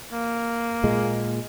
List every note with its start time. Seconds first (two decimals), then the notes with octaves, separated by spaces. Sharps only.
0.12 A#3
0.84 A#2 G#3